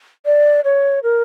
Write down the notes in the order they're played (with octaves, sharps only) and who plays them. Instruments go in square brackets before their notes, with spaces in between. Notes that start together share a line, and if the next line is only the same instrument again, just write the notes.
[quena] D5
C#5
A#4